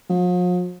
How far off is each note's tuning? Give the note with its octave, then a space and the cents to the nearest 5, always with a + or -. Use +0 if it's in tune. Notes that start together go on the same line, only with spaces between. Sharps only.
F3 +45